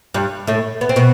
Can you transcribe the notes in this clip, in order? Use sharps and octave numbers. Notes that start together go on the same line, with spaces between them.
G2 G3
A2 A3
B3
C4
B2 B3